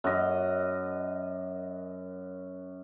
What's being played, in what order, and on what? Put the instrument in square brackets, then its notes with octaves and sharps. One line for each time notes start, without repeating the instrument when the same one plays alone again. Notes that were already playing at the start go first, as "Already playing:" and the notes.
[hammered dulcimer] F#2 D#5